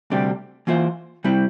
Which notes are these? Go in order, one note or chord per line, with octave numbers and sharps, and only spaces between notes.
D2 C3 G3 D4 G4
E3 A#3 F4 C5 E5
C3 G3 C4 E4